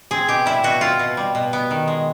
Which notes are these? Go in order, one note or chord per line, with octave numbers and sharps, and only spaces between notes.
C4 G#4
B2 G4
G3 E4
B2 F#4
C4 F4
B2
G3
B2
B3
D#3
G#3